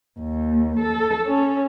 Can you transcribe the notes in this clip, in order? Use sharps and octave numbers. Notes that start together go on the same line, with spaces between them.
D#2
A4
C#4